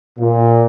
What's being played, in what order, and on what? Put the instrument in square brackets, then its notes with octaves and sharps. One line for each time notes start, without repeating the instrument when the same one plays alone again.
[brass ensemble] A#2